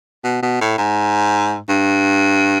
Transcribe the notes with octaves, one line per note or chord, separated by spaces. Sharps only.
B2
B2
A2
G#2
G2